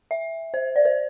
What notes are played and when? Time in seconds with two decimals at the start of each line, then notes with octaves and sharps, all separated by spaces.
0.11 E5
0.54 C5
0.76 D5
0.85 C5